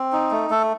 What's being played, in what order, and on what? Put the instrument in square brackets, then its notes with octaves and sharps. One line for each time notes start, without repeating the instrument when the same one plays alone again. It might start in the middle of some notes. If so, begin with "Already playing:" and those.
Already playing: [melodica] C4
D#4
A3
A3 A4